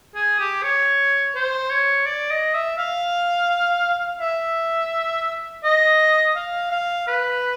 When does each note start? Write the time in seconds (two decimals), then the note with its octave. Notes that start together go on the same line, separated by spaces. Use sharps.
0.15 G#4
0.39 G4
0.63 C#5
1.35 C5
1.70 C#5
2.06 D5
2.30 D#5
2.54 E5
2.78 F5
4.21 E5
5.64 D#5
6.36 F5
6.71 F5
7.07 B4